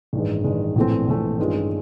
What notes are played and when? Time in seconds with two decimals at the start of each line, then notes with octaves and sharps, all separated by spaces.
0.13 A1 G2 D#3 G#3
0.44 A1 G2 D#3 G#3
0.76 A#1 A2 E3 A3 C4
1.08 A#1 A2 E3 A3 C4
1.38 G2 D#3 G#3 C#4 F4